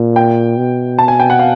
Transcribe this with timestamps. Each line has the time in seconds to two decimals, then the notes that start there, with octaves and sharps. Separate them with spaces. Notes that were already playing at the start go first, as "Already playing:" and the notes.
Already playing: A#2
0.16 G5
0.58 B2
0.99 A5
1.08 G#5
1.20 G5
1.30 F#5
1.39 F5